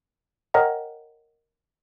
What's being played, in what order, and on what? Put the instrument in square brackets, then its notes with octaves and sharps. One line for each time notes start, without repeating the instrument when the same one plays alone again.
[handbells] A#4 C#5 D#5 F#5 G5 A#5